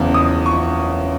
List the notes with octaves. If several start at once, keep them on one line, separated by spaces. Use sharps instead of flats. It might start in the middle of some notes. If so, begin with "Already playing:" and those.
Already playing: F#1 E2 C#3
D#6
C#6